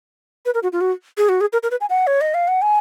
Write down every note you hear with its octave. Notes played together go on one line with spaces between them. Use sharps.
B4
A#4
F#4
F4
F#4
G#4
F#4
G#4
A#4
A#4
B4
G#5
F#5
C#5
D#5
F5
F#5
G#5